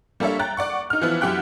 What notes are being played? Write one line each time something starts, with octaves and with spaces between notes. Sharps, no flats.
G3 A#3 D4 A4 C#5 E5
G5 A#5 F#6 A6
D5 F#5 C#6
D#4 F6
E3 F3 B3 E4
F#2 E4 G4 F#5 G5 F#6